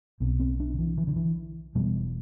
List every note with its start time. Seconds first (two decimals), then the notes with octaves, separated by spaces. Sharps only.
0.20 B1 B2 C4
0.40 C4
0.60 D4
0.74 D3
0.79 E3
0.98 E3
1.07 D3
1.16 E3
1.75 E1 E2 B2 G3